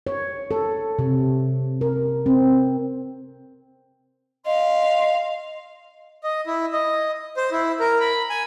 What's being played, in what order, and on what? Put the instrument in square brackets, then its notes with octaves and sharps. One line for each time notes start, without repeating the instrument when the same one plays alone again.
[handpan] C#5
A4
C3
A#4
C4
[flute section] D#5 C6 [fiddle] F5
[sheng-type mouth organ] D#5
E4
D#5
C5
E4
A#4
B5
G#5